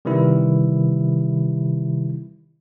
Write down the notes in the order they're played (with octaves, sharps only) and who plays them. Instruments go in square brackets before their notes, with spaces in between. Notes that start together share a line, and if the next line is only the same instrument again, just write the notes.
[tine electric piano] C3 D#3 E3 G3 E4